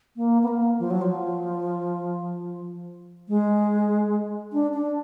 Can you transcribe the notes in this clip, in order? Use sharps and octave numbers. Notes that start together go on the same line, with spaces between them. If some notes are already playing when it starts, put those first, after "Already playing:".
A#3
B3
A#3
F3
F#3
F3
G#3
D4
D4